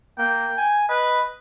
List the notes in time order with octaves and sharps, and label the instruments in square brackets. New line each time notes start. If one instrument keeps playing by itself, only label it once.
[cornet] A#3 [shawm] G5
[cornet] G#5
[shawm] B4 [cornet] D#5